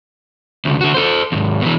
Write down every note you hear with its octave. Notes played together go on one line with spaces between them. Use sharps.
D2 C#3
D3 F#4
A4 C5
D#2 G#2
B2 E3